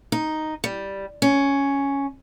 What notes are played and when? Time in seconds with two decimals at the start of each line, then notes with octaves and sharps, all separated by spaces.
0.12 D#4
0.64 G3
1.22 C#4